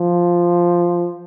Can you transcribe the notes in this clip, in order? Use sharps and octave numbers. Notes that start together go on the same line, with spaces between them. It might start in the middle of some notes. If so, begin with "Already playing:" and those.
Already playing: F3